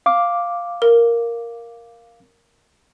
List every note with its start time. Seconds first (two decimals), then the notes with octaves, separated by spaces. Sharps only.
0.06 F5 D6
0.82 A#4